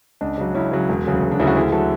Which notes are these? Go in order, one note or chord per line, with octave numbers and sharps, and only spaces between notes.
C#2 D4
C#3 F#3
C#2 C#4 E4
C#3 F#3
E1
D2 C#3 F#3
E1
D4
D2 C#3 F#3 E4
F#4
D2 E4 G#4
D3 F#3 F#4 A4